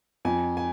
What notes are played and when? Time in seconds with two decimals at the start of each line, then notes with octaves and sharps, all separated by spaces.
0.25 F2 G#5
0.57 G#5